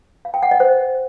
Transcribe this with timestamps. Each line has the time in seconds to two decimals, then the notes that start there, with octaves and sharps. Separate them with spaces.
0.25 F5
0.34 G5
0.43 F#5
0.51 D#5
0.60 C5